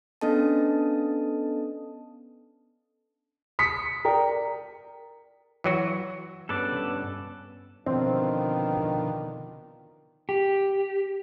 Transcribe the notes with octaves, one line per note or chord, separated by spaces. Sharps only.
B3 C#4 D4 A4 D#5 A5
D#6 B6 C#7
A#4 D5 G5
E3 F#3 F#4
G2 B3 C#4 A4 B4 D5
B2 D3 D#3 F3 C4
G4